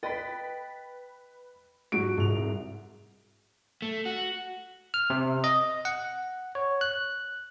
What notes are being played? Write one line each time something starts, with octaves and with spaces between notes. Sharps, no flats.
B4 D#5 G5 B5 A6 B6
G#2 F3 G3 F#4 D7
C2 G#2 F7
A3
F#4
F6
C3
D#5
F#5
C#5
F#6